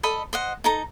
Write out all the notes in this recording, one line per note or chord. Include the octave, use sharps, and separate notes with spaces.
A4 D#5 B5
C5 D#5 F#5
D#4 A4 A#5